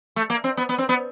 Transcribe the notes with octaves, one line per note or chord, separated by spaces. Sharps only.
A3
A#3
C4
B3
B3
C4
B3